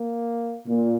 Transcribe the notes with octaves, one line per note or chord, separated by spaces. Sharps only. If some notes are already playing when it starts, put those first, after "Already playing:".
Already playing: A#3
A#2